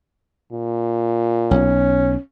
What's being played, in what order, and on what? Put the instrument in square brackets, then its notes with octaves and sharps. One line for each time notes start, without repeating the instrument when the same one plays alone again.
[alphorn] A#2
[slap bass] B1 [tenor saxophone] C#4